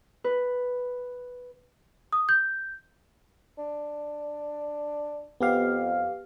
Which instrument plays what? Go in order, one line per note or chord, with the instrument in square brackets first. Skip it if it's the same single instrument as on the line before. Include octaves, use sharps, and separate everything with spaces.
[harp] B4
[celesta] D#6
G6
[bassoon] D4
[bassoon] F2 [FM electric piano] B3 G4 F5